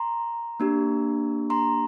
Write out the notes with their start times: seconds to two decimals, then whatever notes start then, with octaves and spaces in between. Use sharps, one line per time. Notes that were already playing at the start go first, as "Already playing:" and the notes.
Already playing: A#5 C6
0.60 A#3 D4 G4
1.50 A#5 C6